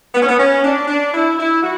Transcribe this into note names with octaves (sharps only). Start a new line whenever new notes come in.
B3
C#4
B3
C#4
D4
D4
E4
E4
F#4